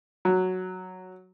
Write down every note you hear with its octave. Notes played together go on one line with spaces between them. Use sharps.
F#3